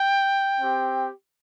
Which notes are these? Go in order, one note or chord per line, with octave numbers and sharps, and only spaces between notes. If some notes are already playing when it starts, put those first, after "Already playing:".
Already playing: G5
C4 G4